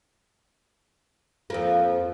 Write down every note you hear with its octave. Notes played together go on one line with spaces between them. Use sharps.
F2 F3 A#3